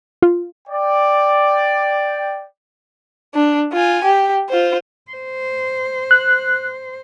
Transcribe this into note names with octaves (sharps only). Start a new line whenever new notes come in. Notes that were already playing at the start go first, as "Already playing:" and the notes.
F4
D5 G5
D4
F4 G#5
G4
F4 C5
C5
F#6